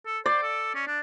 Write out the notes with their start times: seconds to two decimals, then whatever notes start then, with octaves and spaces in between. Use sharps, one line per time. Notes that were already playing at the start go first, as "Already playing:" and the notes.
0.06 A4
0.26 C5 D5
0.43 A4
0.75 C#4
0.87 D4